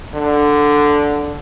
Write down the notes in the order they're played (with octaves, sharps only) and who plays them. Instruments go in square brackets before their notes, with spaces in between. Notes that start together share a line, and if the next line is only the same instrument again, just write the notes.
[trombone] D3